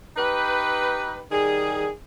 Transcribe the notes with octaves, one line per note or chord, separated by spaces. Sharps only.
D#4 G4 B4
D#3 G3 G#4